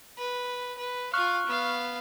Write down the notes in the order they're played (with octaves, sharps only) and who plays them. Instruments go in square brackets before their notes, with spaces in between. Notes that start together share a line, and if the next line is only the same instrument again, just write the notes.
[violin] B4
B4
[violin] F4 F5 [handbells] C#6 F6 F#6
[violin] B3 F5